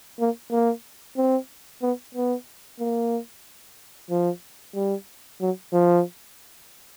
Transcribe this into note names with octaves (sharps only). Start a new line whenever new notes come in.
A#3
A#3
C4
B3
B3
A#3
F3
G3
F#3
F3